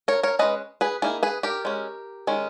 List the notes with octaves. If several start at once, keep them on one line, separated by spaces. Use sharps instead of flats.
A#4 C#5
A#4 C#5
G#3 C#4 B4 D#5
G#4 B4
D#3 A#3 D#4 E4 G#4
G#4 B4
G4 A#4
G#3 C#4
D#3 G#3 C#4